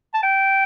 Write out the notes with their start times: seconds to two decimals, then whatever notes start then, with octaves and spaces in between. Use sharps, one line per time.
0.14 A5
0.23 G5